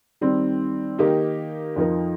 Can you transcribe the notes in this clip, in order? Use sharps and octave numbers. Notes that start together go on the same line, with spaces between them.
D#3 G3 C4
D#3 A#3 D#4 G4
F2 F3 D#4 A#4